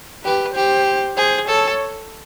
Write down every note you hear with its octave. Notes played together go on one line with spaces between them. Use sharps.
G4 B4
G4 C5
G#4 C5
A4 C#5